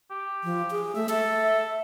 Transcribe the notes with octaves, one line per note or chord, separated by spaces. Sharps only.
G4
F3
G#4
A3 E5
A4 E5